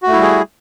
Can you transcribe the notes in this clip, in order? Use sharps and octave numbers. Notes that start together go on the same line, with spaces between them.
G3 A3 E4 F#4 G#4